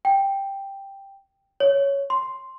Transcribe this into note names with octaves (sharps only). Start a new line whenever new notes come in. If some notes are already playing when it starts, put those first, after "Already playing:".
G5
C#5
C6